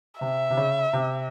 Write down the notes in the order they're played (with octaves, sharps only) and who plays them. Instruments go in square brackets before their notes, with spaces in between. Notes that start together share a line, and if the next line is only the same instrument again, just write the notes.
[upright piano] C3 [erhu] E5
[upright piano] C3
C#3
C3